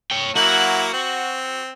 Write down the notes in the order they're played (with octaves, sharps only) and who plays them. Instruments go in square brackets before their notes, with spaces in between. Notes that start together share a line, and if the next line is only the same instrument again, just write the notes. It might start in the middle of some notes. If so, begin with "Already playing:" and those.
[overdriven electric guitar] C#5 G5
[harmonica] F#3 A#3 E4 [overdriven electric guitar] F#4 F#5
[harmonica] C4